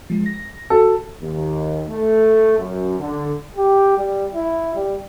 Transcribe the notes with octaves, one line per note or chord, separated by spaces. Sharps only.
F3 G#3
A#6
F#4 A4
D#2
A3
F#2
D3
G4
G3
E4
G3